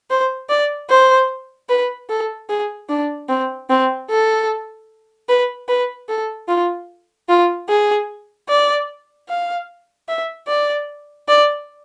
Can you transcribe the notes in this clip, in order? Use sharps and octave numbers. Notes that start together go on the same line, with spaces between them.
C5
D5
C5
B4
A4
G#4
D4
C4
C4
A4
B4
B4
A4
F4
F4
G#4
D5
F5
E5
D5
D5